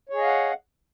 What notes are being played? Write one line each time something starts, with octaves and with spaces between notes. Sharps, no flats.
G#4 C#5 D#5 F5 F#5